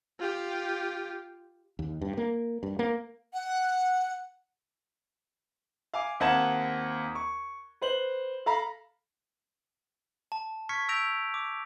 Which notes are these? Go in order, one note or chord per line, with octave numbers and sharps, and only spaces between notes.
F4 G4
D#2
G2
A#3
G2
A#3
F#5
F5 G#5 D6
D#2 C4 F#5 A5 G#6 E7
C#6
B4 C5 F#7
A4 F5 A#5 B5
A5
C#6 F6 G#6 B6 C#7
E6 G6 A#6 D7 F7
D6